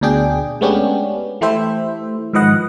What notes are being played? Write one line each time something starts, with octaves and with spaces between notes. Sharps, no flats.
D2 B2 D4 G#4 G5
G#3 A3 B3 C#4 D4 G4
E3 A3 E4 G4 C5 E5
G#2 D#3 F3 B4 D#5 F#5